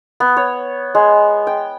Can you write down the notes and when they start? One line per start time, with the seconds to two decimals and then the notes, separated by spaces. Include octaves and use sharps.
0.20 B3
0.37 C#5
0.95 G#3
1.47 G5